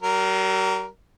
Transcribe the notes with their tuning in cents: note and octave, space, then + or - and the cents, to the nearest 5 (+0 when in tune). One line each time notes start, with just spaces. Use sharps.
G3 -45 A#4 +0